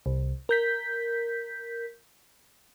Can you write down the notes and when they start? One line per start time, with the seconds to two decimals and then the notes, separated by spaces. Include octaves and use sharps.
0.06 C2
0.49 A#4 G6 B6